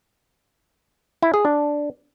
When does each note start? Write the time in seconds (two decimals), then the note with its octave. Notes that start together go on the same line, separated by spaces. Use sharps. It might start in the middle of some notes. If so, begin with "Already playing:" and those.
1.22 E4
1.34 G#4
1.45 D4